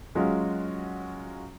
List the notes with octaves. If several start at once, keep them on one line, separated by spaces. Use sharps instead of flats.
F#3 G#3 C#4 F4 F#4